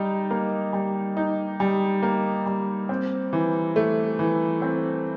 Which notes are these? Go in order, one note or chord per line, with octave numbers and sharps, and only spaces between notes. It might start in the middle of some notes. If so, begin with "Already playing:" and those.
Already playing: G3 D#4
A#3
G3
D#4
G3
A#3
G3
C4
E3
A3
E3
C4